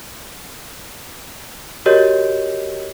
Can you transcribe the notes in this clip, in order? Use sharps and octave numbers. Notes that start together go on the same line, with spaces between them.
F#4 G4 A#4 C#5 D#5 G6